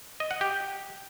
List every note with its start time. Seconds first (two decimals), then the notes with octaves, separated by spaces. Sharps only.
0.20 D#5
0.31 F#5
0.41 G4